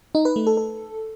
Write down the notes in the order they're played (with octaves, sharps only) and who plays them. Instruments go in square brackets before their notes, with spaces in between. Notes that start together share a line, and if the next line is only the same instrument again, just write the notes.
[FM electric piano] D#4
B4
A3
A4
A4